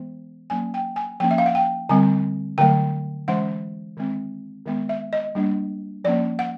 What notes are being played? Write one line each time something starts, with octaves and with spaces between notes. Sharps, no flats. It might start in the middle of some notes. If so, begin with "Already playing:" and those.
Already playing: E3 G#3 B3
F#3 A#3 C#4 G#5
G5
G#5
F3 A#3 C#4 G5
E5
F5
F#5
G5
D3 G3 C4 G#5
D3 F#3 A3 G5
E3 G#3 C#4 F#5
D#3 G#3 C4
D#3 G#3 B3
E5
D#5
G3 A#3 D4
F3 A#3 C#4 D5
F#5